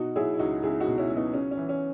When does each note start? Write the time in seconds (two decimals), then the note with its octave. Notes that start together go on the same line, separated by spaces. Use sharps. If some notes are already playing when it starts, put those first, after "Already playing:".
Already playing: B2 D#4 F#4
0.16 F#3 E4 G#4
0.34 E4
0.39 C#2 D#4 F#4
0.63 C#2 E4 G#4
0.80 D#4 F#4
0.87 B2
0.98 C#4 E4
1.10 F#3
1.16 B3 D#4
1.33 C#3 C#4
1.51 C#4
1.57 E3
1.69 C#4